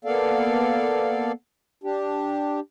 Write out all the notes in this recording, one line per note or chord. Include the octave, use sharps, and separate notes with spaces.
A#3 B3 A4 D5 F5
D4 G4